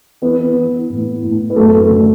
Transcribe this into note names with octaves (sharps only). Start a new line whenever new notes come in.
E3 B3 B4
E3
A2
A2
B4
F#2 A3 A4
D3